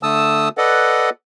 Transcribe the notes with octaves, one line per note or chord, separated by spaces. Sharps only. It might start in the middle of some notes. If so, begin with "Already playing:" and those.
D3 A3 A5 D#6 E6
A4 B4 D5 D#5 F#5